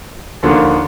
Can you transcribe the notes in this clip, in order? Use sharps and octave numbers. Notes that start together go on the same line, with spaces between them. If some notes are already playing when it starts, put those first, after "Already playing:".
D#2 D3 F3 A#3